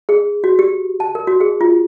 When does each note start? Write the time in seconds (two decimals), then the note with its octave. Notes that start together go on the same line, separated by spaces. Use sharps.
0.09 G#4
0.44 F#4
0.59 G4
1.00 A5
1.15 A#4
1.27 F#4
1.40 G#4
1.61 F4